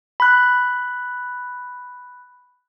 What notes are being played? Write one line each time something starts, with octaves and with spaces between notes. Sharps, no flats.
B5 F#6